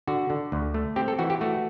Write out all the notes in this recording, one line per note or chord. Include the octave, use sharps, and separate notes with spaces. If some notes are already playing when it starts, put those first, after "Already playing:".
D3 F#4
D3
D2
A3
C4 G4
A4
E3 F#4
G4
A3 F#4